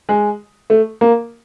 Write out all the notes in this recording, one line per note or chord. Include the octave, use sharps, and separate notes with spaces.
G#3
A3
A#3